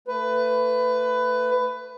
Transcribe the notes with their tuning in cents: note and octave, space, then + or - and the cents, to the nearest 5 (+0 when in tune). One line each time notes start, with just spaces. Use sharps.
A3 +30 B4 +20